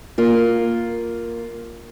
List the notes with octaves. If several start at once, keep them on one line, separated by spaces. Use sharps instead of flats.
A#3 F4